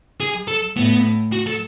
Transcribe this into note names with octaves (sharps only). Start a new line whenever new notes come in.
G#4
A4
A2 B3
F#4
A4